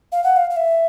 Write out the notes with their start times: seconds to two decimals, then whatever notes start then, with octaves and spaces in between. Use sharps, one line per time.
0.12 F5
0.24 F#5
0.36 F5
0.50 F5
0.57 E5